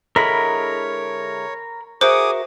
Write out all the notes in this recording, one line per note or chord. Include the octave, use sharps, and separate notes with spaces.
D3 G#3 E4 A#4 C#5 B5
F#4 G#4 A#4 C5 E5 D6 D#6